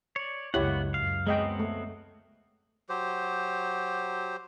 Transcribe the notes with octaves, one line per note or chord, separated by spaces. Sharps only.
C#5 D5
C#2 F#2 A#3 B3 E4 G4 C#5 F#5
F#2 F5
F#3 G#3 B3 C4 D#5 G5
A3
F#3 G4 C5